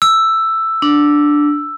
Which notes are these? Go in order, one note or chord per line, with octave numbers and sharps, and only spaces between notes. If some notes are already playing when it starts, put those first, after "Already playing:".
E6
D4